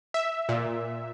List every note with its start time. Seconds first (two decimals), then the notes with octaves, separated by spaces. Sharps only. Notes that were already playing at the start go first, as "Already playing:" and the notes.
0.14 E5
0.49 A#2